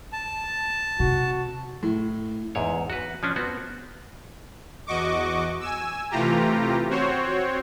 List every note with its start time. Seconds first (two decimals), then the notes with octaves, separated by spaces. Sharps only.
0.13 A5
1.00 C3 F#4
1.83 A2
2.55 E2 G#2 C#5
2.90 F#4 B4
3.23 F3 C#4 D4
3.36 B3 C4 F#4
4.87 E2 F#4 D#5 C#6 D6
5.60 G#5 E6
6.10 C3 E3 A3 F4 G4 A#5
6.89 C4 F#4 C5 C#5